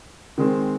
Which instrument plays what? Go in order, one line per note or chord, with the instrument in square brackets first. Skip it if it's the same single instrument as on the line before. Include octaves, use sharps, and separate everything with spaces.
[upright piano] D#3 G#3 C4